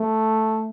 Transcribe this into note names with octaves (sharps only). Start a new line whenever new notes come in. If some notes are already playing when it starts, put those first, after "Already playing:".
Already playing: A3